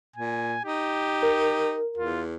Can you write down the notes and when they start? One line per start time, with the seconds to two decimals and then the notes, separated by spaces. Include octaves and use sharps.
0.16 A#2 G#5
0.65 D#4 G4
1.23 A#4
1.97 E2 F4